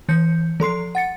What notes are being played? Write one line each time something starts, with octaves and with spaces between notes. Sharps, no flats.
E3 G6 C#7
F3 A4 C6 C7
F#5 A6 C#7